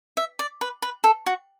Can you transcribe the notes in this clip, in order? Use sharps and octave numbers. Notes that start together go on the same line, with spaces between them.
E5
D5
B4
B4
A4
F#4